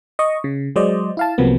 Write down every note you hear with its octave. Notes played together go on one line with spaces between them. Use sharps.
D#5 C#6
C#3
F#3 G#3 C5 D5 D#5
E4 F5 A5
C2 C3 F3 F#3 A#3 B3